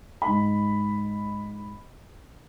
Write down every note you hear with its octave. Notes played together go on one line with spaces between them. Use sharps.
G#2 B5